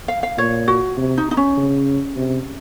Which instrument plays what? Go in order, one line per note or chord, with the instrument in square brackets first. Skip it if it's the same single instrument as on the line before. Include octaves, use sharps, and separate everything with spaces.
[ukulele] F5
F5
[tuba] A#2 [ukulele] C#5
[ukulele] F#4
[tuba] C3
[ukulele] D#4
D#4
C#4
[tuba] C#3
C3